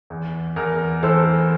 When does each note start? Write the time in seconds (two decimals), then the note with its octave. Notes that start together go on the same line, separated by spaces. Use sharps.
0.10 E2
0.56 E2 A#4
1.03 E3 A4 C5